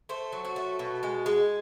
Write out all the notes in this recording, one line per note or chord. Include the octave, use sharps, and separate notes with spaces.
A3 C5
F#3
F#4
A3
B2
G#3
G#3